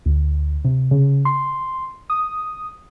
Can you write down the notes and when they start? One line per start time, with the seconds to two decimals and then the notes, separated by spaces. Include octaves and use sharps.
0.06 D2
0.65 C3
0.91 C#3
1.25 C6
2.10 D#6